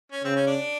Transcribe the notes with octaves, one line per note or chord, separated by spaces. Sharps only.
C#4
C#3 C4
C#4
D4